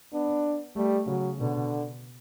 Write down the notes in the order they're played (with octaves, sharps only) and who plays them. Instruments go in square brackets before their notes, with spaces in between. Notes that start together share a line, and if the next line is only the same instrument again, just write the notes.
[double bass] B3 [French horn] D4
[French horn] G3 [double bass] A3
[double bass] C#3 [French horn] F#3
[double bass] B2 [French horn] D3